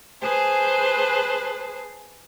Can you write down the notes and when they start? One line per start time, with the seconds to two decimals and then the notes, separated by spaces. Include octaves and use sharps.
0.21 G#4 B4 C5 A5